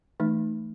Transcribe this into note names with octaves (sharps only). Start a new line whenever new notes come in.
E3 A3 D#4